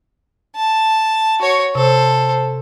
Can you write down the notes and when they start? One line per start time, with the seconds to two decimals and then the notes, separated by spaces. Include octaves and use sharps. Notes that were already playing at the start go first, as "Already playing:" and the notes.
0.56 A5
1.39 F#4 C#5
1.75 C3 A4 C5